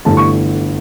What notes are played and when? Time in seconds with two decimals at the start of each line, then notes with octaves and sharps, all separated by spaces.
0.05 G1 G2 E3 A3 A5
0.17 C#6